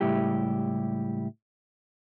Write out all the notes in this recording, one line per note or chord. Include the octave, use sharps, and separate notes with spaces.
C#2 A2 G3 E4 G4